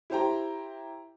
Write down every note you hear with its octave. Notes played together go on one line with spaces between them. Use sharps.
E4 G4 C5 G5 A#5